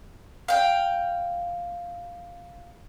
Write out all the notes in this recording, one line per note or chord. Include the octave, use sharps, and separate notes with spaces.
F5 G5